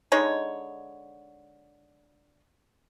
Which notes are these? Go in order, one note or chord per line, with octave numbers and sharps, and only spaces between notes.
D3 G#3 D#4 C#5